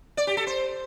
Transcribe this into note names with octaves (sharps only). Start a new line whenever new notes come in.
D5
G4
A4
C5